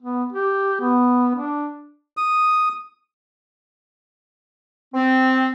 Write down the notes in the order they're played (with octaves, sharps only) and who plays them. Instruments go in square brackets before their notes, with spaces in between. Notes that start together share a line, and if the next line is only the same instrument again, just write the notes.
[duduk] B3
G4
B3
D4
[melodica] D#6
[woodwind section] C4